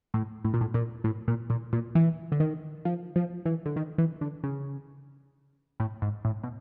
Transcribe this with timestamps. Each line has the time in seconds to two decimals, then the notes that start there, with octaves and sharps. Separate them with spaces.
0.14 A2
0.44 A2
0.54 A#2
0.61 A2
0.74 A#2
1.04 A2
1.28 A#2
1.50 A#2
1.73 A#2
1.95 E3
2.32 D3
2.40 D#3
2.85 F3
3.16 F3
3.46 E3
3.66 D3
3.76 D#3
3.98 E3
4.21 D3
4.44 C#3
5.80 A2
6.02 G#2
6.25 A2
6.43 B2